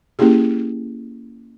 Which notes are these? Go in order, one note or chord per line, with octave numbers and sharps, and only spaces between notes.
A#3 C#4 E4 G4 G#4